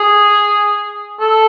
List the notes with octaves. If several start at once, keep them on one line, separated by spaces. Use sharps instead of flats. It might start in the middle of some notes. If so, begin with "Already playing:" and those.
Already playing: G#4
A4